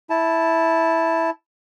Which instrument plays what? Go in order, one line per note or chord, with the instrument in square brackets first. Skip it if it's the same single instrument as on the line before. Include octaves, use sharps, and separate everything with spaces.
[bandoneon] E4 A5